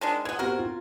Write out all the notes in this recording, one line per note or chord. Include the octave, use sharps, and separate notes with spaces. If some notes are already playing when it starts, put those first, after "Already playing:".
D#3 G#3 D4
E3 B3 G#6
B3 C4 F#4 G4 A#4
F4